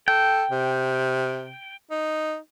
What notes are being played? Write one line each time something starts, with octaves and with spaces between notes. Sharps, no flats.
A4 G5
C3
D#4